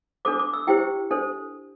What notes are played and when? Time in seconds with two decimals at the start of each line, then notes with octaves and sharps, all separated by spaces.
0.25 D4 A4 C5 D6
0.39 D6
0.53 E6
0.67 E4 G4 C5 G5
1.11 D4 A4 C5